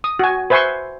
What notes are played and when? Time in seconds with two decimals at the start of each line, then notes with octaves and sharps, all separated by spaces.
0.04 D#6
0.19 F#4 G#5
0.50 B4 C5 E5 G#5 C6 C#6